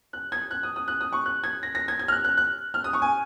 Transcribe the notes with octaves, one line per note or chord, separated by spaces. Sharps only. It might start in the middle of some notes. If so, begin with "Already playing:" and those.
F#6
G#6
F#6
D#6
D#6
F#6
D#6
C#6
F#6
G#6
A#6
A#6
G#6
G#6
F6
F#6
F#6
F#6
F6
D#6
C#6
G#5